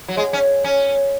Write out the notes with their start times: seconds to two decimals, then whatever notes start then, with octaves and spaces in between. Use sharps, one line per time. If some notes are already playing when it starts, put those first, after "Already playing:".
0.09 F#3
0.17 G#3
0.33 C#4
0.64 C#4